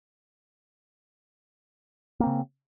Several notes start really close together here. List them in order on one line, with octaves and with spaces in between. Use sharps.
A#3 C4 C#3